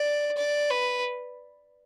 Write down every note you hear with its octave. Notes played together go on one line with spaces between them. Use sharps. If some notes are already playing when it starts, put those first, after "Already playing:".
Already playing: D5
D5
B4